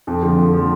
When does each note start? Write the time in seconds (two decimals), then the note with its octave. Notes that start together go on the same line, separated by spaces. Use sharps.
0.07 F2
0.23 D3 F3
0.38 F2
0.53 D3 F3